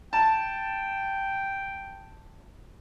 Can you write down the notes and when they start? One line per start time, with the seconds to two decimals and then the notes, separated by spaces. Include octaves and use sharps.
0.13 G5 A5